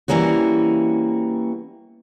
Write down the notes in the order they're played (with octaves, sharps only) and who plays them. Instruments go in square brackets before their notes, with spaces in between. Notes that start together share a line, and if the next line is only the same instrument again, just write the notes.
[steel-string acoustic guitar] E3 G3 A#3 C#4 F#4